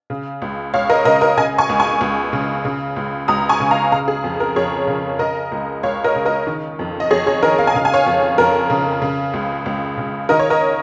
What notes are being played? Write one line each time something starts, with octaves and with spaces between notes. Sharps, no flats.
C#3
C#2
C#2 C#5 F5
A#4 D#5
C#3 A#4 D#5
A#4 D#5
C#3 D#5 G#5
G#5 C#6
C#2
G#5 C#6
C#2
C#3
C#3
C#2
C#2 A#5 D#6
G#5 C#6
C#3
F5 A#5
C#3 F5 A#5
G#4
F2
A#4
F2 G#4 C#5
C#3
C#3 A#4 D#5
C#2
C#2 C#5 F5
A#4 D#5
C#3
A#4 D#5
D#3
F2
D#5
F2 G#4 C#5
G#4 C#5
D#3 A#4 D#5
F5
G#5
C#3 F5
G#5
C#5 F5
F2
F2 A#4
C#3
C#3
C#2
C#2
C#3
D#3 A#4 D#5
C#5
A#4 D#5